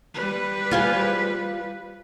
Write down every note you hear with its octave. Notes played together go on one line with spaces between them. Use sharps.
G3 B4
F4 G#4 C5